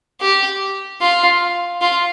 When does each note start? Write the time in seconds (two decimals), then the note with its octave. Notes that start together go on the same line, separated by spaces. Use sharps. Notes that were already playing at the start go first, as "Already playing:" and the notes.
0.21 G4
1.01 F4
1.81 F4